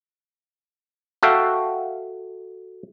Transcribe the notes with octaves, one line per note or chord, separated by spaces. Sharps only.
F#4 A4 E5 F5 G5